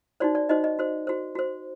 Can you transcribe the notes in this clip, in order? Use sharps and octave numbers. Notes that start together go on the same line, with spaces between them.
D#4 F#4 C5 D5
D5
D#4 F#4 C5 D#5
D#5
F#4 C5
F#4 C5
F#4 C5